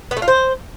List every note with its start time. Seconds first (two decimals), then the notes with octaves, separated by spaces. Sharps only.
0.11 B3
0.17 A3
0.22 F4
0.28 C5